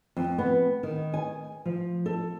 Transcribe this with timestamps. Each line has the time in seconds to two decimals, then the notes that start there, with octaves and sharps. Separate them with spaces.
0.17 F2
0.38 B3
0.83 D#3
1.14 G#5
1.66 F3
2.06 A4